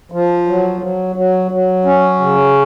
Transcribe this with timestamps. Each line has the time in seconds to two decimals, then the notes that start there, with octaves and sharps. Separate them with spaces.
0.12 F3
0.47 F#3
0.81 F#3
1.16 F#3
1.51 F#3
1.85 C#4
2.20 C#3